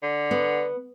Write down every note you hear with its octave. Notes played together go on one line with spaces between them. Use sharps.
D3
B3